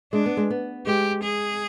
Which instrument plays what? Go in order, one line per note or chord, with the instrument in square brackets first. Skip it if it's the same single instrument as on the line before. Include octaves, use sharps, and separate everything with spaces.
[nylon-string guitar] G#3 [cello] D4
[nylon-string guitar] B3
G#3
B3
[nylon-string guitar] G#3 [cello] G4
[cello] G#4